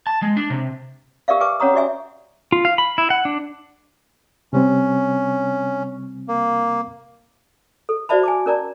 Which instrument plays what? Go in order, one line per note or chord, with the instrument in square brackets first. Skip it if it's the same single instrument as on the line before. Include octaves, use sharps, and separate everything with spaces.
[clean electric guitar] A5
G#3
D4
C3
[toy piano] G4 A#4 D5 E5 F5
G4 A#4 B4 G#5 C#6 D6
C#4 C#5 F#5 A#5 D#6
F#4 G4 D5 E5 G#5
[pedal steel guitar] F4
F5
B5
E4
F#5
D4
[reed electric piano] C3 G3 C4 [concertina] C#4
[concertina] A#3
[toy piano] A4
F#4 C5 D5 E5 A5 B5
G#5 A5 D6
C#4 A#4 D5 A5 A#5